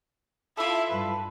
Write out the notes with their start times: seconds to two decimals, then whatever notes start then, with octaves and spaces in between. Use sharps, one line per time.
0.57 E4 F4 A4 E5
0.89 G2 B4